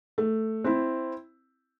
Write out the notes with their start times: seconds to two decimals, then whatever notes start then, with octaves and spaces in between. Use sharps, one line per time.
0.18 A3
0.64 C4 E4